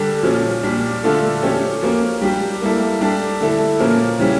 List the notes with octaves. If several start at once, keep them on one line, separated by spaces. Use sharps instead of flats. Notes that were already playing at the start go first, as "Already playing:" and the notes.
Already playing: D3 G3 D4 A4
A#2 F3 C#4
A#2 G3 D4
D3 A3 D4 F4 A4
F3 A3 C#4 G4
F3 A#3 C#4
G3 D4 G4
G3 A#3 E4 A4
G3 D4 A4
D3 A3 E4 A4
A#2 F3 A#3 C#4
C#3 E3 G3 C#4